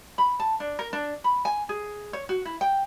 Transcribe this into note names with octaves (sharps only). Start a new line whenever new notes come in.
B5
A5
D4
A#4
D4
B5
G#5
G#4
C#5
F#4
E4
G5